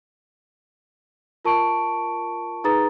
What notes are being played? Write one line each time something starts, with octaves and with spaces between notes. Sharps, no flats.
F4 A#4 A5 C#6 D7
D#4 G#4 B4 A#5 D#6 A6